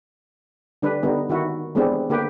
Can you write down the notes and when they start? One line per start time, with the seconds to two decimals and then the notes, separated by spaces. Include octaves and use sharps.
0.82 D3 G3 D4 B4
1.03 D3 G3 B3 D#4
1.29 D#3 E4 F#4
1.75 E3 G3 G#3 B3 C4 D4
2.10 D3 A#3 G4 B4